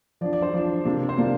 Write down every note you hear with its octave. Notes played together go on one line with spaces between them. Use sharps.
F3 D4 D5
D5
C5
F3 D4 D5
C3 A#3 D4
C5
C3 A#3 D4 D5